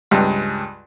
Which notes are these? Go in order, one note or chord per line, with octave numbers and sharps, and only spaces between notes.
C#2 G2